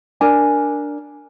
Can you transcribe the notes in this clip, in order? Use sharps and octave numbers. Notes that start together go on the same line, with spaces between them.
D4 A#4 G#5